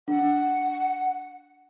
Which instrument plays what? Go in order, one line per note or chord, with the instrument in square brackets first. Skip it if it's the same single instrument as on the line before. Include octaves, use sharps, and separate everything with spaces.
[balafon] D4 [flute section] F#5